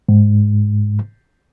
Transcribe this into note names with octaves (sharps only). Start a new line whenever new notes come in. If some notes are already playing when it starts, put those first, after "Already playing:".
G#2